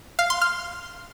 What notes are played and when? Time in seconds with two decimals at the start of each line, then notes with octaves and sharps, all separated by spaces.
0.19 F5
0.30 C6
0.41 F6